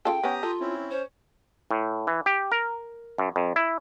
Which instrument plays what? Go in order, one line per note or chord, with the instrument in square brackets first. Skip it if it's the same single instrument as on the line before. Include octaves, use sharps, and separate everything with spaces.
[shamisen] C#3 F4 A4 [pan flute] G5
[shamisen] B3 C#4 [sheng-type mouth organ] G4 A#5 D#6
[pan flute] F4 [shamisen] A4
[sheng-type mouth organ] C4 C#4 E4
[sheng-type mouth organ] C#4 C#5 [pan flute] C5
[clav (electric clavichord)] A2
E3
G4
A#4
F#2
F2
E4